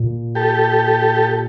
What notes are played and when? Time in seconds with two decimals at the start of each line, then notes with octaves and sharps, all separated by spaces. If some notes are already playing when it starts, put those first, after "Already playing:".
Already playing: A#2
0.35 G4 A4